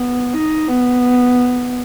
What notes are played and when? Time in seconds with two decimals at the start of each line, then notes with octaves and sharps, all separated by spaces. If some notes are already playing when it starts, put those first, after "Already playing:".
Already playing: B3
0.34 D#4
0.68 B3